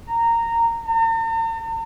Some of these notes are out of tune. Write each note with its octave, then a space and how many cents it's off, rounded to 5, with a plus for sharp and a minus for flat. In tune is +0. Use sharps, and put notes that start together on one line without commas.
A#5 -15
A#5 -45